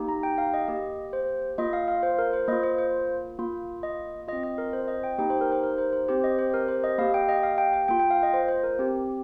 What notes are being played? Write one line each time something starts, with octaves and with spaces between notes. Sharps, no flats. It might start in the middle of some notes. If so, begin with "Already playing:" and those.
Already playing: A#3 D#4 G4
A#5
G5
F5
D#5
A#3 G4 D#5
C5
A#3 F4 D#5
F5
F5
C5
A#4
C5
A#3 F4 D#5
C5
C5
A#3 F4
D#5
C4 F4 D#5
D#5
A#4
C5
D#5
G5
A#3 D#4 G4 G5
C5
A#4
C5
A#4
C5
C5
C4 G4 C5
D#5
C5
A#4
C5
D#5
A#3 G4 F5
G5
D#5
F5
G5
G5
A#3 F4 G5
G5
F5
D#5
C5
C5
A#4
C4 G4